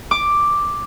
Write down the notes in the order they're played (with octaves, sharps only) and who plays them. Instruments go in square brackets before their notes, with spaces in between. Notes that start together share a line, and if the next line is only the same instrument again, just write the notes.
[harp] D6